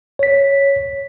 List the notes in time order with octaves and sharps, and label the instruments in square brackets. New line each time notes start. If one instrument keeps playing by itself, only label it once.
[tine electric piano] C#5 B6